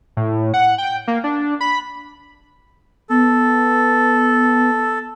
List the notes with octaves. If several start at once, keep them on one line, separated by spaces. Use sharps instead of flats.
A2
F#5
G5
A#3
D4
B5
B3 A4